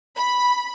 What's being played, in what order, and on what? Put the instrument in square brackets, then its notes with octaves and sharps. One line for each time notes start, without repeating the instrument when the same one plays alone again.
[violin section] B5